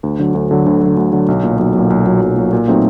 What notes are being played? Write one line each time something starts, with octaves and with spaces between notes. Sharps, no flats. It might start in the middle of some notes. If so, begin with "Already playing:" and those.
D2
D3 F#3
D2
D3 F#3
D2
D3 F#3
D2
D3 F#3
B1
A#2 F#3
B1
A#2 F#3
B1
A#2 F#3
B1
A#2 F#3
A#2
F#3 A3 C4 D#4